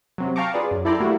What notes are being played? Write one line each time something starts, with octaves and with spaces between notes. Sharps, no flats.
C3 F#3
F5 G5 A5 A#5 C#6 D6
F4 G#4 B4 D5
F#2
E4 A4 D5 G5 A#5 C6
G3 A3 A#3 E4 F#4